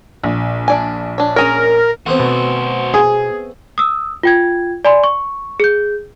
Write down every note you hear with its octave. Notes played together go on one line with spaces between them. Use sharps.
A#1
D4 D5 G#5
D4 C#5
C#4 G#4 A#4 C#5
A3 B3 C4 F#4 C5
B2
G#4
D#6 E6
F4 G5 G#6
D5 G#5 B5 C6
C#6
G#4 G6